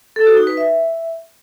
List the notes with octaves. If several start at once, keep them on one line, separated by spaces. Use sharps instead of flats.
A4
F#4
D#4
B4
E5